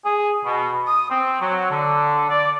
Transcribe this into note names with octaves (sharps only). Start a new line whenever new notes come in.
G#4
B2
D#6
C4
F#3
D3
D5